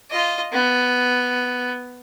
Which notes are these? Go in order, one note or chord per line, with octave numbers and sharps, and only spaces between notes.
F4 D#5
B3